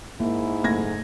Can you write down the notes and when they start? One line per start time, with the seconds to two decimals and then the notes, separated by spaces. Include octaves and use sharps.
0.20 G#2 A#3 E4
0.64 F#1 A3 G#6 A#6